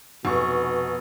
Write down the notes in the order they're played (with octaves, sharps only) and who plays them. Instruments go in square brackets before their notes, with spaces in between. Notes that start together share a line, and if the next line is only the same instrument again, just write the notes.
[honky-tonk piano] F1 C#6 [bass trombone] B2